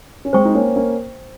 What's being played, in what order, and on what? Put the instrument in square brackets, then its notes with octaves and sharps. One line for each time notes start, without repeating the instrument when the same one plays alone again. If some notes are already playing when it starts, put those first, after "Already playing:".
[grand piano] C#4
[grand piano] G#3 C4 [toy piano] C5 G5 C#6
[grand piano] D#4
A#3 C#4
A#3 C#4